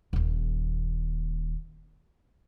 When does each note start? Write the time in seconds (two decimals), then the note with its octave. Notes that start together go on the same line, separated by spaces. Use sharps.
0.13 D#1 D#2